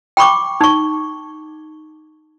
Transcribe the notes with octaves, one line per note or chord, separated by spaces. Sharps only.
G5 B5 C#6 D6
D#4 C#6